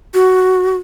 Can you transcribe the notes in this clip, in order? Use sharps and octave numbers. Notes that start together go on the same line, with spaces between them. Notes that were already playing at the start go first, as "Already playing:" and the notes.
F#4